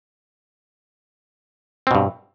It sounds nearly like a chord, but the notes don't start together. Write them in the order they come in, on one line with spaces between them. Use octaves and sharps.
C4 B2 G2